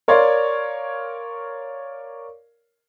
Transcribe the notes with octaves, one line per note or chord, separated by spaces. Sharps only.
A#4 C#5 D5 F5 C6